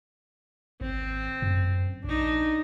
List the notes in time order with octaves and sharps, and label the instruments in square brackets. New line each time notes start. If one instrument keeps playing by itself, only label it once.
[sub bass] G#1 [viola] C4
[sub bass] F#2
[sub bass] A#1 [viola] D4 D#4